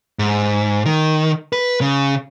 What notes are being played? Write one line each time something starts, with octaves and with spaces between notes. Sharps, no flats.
G#2
D#3
B4
C#3